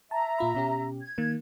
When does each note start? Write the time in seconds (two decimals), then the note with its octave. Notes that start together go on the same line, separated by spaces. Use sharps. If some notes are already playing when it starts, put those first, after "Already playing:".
0.11 E5 A5 A#5
0.38 A#2 F4 B5
0.55 B2 C#4 G4
1.02 G#6
1.18 D#3 A#3